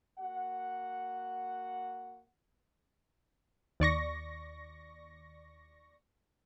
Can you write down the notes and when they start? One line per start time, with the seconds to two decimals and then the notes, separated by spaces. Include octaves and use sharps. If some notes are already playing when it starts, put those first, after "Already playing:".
0.19 A#3 F#4 F#5
3.80 D#2 D5 C#6 A#6